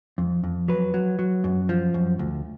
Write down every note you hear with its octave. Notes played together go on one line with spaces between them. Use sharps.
F2
F2
F#3 B4
F#3
F#3
F#2
F3
F#2
D2